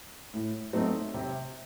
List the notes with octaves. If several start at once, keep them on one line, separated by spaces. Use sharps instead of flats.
A2
F#3 A3 C4 D#4
C3